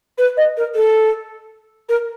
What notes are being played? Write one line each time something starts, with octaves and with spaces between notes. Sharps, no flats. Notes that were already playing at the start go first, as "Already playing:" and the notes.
B4
D#5
A#4
A4
A#4